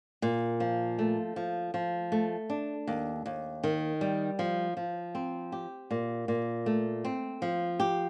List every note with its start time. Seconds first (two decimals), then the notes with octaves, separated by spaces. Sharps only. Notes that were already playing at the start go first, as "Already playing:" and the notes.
0.22 A#2
0.60 F3
0.99 A3
1.36 F3
1.74 F3
2.12 A3
2.50 D4
2.87 D#2
3.26 D#2
3.63 D#3
4.01 G3
4.39 F3
4.77 F3
5.15 C4
5.52 G4
5.91 A#2
6.28 A#2
6.66 A3
7.05 C4
7.42 F3
7.80 G4